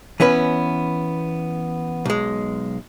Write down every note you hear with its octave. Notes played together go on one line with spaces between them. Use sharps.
E3 B3 C#4 B4
B1 G#3